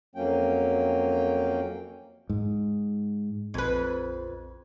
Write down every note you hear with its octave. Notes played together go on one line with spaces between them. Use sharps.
F2 F#3 A#3 C#4 G5
G#2
A#1 F2 C4 B4 G#6